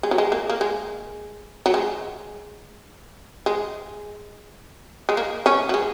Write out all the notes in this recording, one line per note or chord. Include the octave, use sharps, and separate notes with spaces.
G#3
F#3
G#3
A#3
A#3
G#3
F#3
G#3
G#3
G#3
A#3
C#4
F#3
G#3